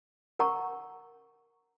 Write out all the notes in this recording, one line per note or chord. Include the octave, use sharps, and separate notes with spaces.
A#4 F#5 A#5 C#6